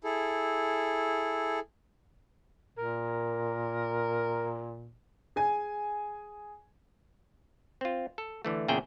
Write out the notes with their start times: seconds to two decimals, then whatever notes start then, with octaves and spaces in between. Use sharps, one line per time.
0.04 E4 G#4 A4
2.78 A#2 A#4
5.36 G#4 G#5
7.81 C4 F4
8.18 A4
8.45 D3 E3 A3
8.68 E2 A#2 C#3 G#4 E5 G5